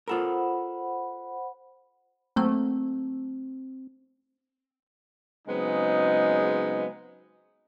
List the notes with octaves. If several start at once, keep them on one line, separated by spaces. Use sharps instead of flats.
F4 A4 A#4 C5 F#5 B5
F#3 A3 A#3 C4
C#3 F#3 G#3 B3 C4 D#4